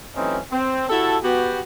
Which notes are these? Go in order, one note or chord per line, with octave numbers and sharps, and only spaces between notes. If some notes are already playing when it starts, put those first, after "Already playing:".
E3 F#3 A3 C4 C#4 D#4
C4
E4 F#4 G4 A4
B3 F#4 G4